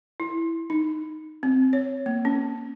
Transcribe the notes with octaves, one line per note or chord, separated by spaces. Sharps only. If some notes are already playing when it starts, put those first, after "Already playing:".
E4
D#4
C4
C#5
A#3
C#4